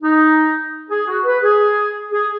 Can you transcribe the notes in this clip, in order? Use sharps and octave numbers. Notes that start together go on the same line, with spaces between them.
D#4
G#4
F#4
B4
G#4
G#4